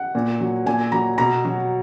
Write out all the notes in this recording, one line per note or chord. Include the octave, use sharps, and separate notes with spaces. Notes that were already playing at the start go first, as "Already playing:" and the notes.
Already playing: F#5
A#2
F#3
A#2 G#5
F#3 A#5
B2 A#5
F#3